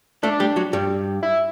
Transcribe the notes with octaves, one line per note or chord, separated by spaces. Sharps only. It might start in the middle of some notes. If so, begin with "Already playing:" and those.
A3 D4 A4
G3 G4
F#3 F#4
G2 G3
E4